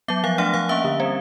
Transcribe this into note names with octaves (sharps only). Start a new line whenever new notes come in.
F#3 B3 E5
F3 F5
A3 D4 F#5
F3 F5
A#3 C#4 E5
D3
G3 C4